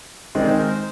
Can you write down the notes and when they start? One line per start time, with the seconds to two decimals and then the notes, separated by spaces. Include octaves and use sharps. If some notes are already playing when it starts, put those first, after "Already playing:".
0.35 D#3 G#3 C4 D5
0.46 C5
0.58 A#4
0.68 C5